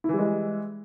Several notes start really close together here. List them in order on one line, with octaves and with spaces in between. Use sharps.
E4 E3 G3 G#3